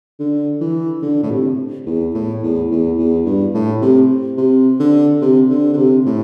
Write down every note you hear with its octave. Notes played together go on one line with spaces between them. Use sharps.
D3
E3
D3
A2
C3
E2
A2
E2
E2
E2
G2
A2
C3
C3
D3
C3
D3
D3
C3
A2